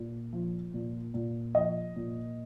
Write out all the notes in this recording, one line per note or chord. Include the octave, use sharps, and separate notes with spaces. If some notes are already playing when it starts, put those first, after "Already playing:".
Already playing: A#2
F3
A#2
A#2
F3 D#5
A#2